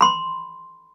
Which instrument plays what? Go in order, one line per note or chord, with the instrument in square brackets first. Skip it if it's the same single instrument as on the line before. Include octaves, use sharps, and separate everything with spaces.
[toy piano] B5 C6